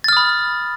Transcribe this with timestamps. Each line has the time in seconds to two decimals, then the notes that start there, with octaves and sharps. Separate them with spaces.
0.04 A6
0.08 F6
0.13 D#6
0.17 B5